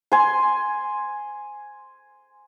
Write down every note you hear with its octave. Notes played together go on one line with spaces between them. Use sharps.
G#5 C6